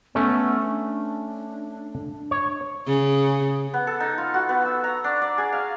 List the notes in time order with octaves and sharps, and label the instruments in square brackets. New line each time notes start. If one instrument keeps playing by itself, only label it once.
[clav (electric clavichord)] A3 C#4 [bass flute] B3
[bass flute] D4
[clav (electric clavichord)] C#5
[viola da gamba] C#3
[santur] B3
A4
D#4
F4
F#4
B3
E6
A#5
D4
D5
G#4
F5